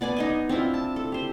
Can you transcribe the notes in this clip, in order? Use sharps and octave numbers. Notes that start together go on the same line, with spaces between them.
B3 D5 G#5 D6
D#4 D#5 G#5
C4 D4 E4 F4
A5
A4
G4 C5